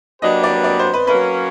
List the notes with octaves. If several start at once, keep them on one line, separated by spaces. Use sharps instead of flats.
F#3 A#3 D4 G4 B4 D#5
D5
D5
C5
B4
F#3 A#3 C#4 B4